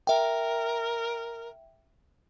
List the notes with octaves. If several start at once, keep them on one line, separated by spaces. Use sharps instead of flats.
A#4 E5 G5